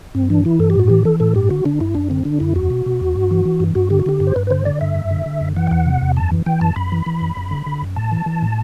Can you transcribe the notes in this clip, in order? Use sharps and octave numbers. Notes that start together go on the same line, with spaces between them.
G2 C4
E3 D4
E3 E4
G2 A4
G4
A2 F#4
E3 G4
E3 A4
A2 A4
G2 G4
D3 F#4
D3 D4
G2 E4
F#2 D4
D3 C4
D3 D4
F#2 E4
E2 F#4
B2
B2
E2
G2
E3
E3
G2
G2 F#4
D3 G4
F#4
D3 G4
G2
C5
G2 B4
B4
D3 C5
D3 D5
G2 E5
F#2
D3
D3
F#2
E3 F#5
G5
E2 F#5
C3
E2
F#2 A5
E3
E3 G5
F#2 A5
F#2 B5
E3
E3
F#2
F#2
D3
D3
F#2
A2 A5
E3
E3
A2